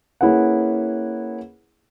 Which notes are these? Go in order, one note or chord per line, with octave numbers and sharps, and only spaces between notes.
A#3 C#4 E4 G#4 B4 F#5